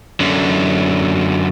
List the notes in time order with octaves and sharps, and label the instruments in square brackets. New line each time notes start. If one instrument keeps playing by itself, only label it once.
[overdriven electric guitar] F#2 D3